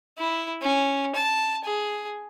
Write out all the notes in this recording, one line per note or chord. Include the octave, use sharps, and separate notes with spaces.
E4
C#4
A5
G#4